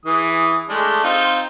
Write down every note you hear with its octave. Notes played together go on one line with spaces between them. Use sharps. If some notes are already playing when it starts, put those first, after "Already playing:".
E3 G#4 D#6
G#3 A3 D4
C4 D#4 F4